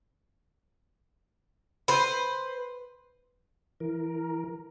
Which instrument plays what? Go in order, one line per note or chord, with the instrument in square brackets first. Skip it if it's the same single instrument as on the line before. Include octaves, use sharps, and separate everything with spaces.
[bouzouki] B4 C5
[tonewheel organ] E3 A#4